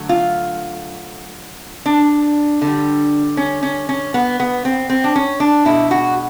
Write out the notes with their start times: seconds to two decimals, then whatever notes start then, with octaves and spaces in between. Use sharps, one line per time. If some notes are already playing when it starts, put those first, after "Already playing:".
Already playing: D3 F#3 A3
0.09 F4
1.86 D4
2.61 D3
2.67 G3
3.37 C#4
3.63 C#4
3.89 C#4
4.14 B3
4.40 B3
4.65 C4
4.90 C4
5.04 D4
5.16 C#4
5.40 D4
5.65 B2 G#3 E4
5.91 F#4